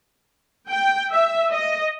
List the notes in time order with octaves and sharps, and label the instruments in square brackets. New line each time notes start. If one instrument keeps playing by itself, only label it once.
[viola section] G5
E5
D#5